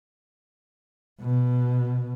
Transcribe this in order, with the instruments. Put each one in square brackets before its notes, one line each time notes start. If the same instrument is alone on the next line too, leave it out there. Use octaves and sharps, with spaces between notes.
[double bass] B2